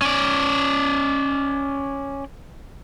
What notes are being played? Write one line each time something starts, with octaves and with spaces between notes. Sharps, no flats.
C#4 D5